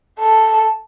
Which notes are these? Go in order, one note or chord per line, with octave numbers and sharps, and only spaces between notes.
A4